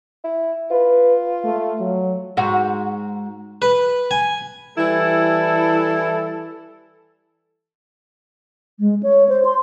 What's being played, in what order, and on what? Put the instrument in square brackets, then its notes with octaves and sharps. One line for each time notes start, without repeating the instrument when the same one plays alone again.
[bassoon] E4
[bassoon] F4 [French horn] B4
[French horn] A3
F#3
[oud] G#2 F#4
[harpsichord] B4
G#5
[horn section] E3 G3 E4 A4
[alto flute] G#3
C#5
C5
C6